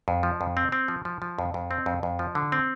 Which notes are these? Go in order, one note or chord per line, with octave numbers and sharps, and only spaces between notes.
F2
F3
F2
C4
C4
F3
F3
F3
F2
F2
C4
F2
F2
F3
D3
C4